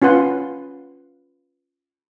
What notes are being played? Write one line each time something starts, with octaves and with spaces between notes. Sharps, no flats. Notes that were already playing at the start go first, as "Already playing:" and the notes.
C#4 F4 B4 F#5 C6